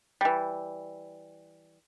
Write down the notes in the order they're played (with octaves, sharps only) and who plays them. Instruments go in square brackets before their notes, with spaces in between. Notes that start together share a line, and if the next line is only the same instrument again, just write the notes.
[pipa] E3 G3